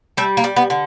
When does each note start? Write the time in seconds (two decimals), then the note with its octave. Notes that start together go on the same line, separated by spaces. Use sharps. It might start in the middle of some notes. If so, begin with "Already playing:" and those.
0.17 G3 A3
0.37 A#3
0.44 G3
0.56 B3
0.70 D3